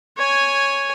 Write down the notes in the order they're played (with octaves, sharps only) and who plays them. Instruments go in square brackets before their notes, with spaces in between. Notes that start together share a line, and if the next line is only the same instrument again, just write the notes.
[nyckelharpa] C#5 G#5